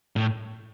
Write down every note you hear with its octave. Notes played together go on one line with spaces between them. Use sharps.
A2